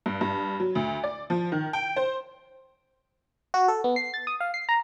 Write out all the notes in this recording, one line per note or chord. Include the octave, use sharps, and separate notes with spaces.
G2
G2
F#3
D2
D5
F3
D#3
G5
C5
F#4
A4
B3
C7
A6
D#6
F5
C7
A#5